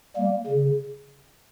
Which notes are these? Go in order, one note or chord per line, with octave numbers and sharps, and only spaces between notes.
G3 A#3
C#3